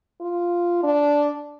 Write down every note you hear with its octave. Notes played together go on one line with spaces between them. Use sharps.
F4
D4